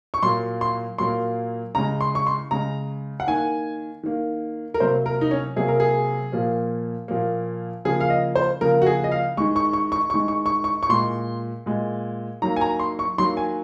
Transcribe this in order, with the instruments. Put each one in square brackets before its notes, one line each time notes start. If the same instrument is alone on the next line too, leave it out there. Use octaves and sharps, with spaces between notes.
[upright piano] C#6
A#2 F#3 A#3 C6
C6
A#2 F#3 A#3 C6
C#3 G#3 A#5
C6
C#6
C6
C#3 G#3 A#5
F#5
D#3 A#3 G#5
D#3 A#3
A#4
C3 F#3 A#3 C5
A#4
D#4
C#4
C3 F#3 A#3 G#4
A#4
G#4
A#2 F3 A#3
A#2 F3 A#3
C#3 F3 A#3 G#4
F5
D#5
C5
C#3 F3 A#3 A#4
F#4
G#4
D#5
F5
D#3 G#3 C#6
C#6
C#6
C#6
D#3 G#3 C#6
C#6
C#6
C#6
C#6
A#2 G#3 C6
A#2 G#3
D#3 F#3 A#3 A#5
G#5
A#5
C6
C#6
D#3 F#3 A#3 C6
G#5